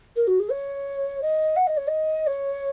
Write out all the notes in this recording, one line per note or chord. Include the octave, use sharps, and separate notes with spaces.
A#4
F#4
G#4
C#5
D#5
F#5
D#5
C#5
D#5
C#5